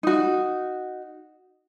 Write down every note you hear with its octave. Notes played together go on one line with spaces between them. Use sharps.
D#4 F#4